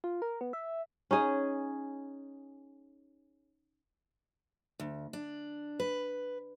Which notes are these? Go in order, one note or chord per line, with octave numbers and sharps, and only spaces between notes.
F4
A#4
B3
E5
C#4 D#4 G#4
D2
D4
B4